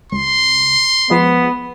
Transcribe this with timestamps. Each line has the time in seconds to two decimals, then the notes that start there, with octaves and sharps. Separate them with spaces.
0.12 C#2 C6
1.10 F3 G#3 B3